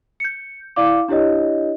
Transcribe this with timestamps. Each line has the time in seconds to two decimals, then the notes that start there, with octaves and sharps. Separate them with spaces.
0.20 G6 C#7
0.76 E4 D5 F5 D6
1.08 D4 E4 G4 C#5 D#5